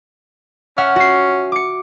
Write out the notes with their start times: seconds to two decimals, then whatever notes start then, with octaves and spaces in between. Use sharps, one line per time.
0.78 C#4 E5 F#5 F6
0.96 F#4 C7
1.52 D6 C#7